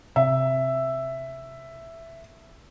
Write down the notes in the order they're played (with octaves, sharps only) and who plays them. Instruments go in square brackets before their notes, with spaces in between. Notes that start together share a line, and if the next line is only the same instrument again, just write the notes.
[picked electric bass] C3 [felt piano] E5